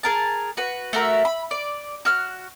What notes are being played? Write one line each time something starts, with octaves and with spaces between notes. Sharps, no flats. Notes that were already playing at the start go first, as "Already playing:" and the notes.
G#4 A#4 A5
F#4 B4
A3 F#4 A#4 E5
B5
D5
F#4 F6 F#6